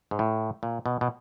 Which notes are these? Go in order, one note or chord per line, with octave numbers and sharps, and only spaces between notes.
G#2
A2
A#2
B2
B2